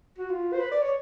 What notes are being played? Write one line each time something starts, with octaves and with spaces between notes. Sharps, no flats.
F#4
F4
C5
B4
D5
C#5